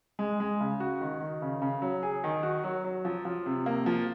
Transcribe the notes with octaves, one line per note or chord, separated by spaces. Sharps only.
G#3
G#3
C#3
F#4
D#3
D#3
C#3
C#3
F#3
G#4
D#3
F#4
F#3
F#3
F3
F3
C3
A#3
F3